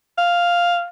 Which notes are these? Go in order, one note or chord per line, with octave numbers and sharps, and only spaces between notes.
F5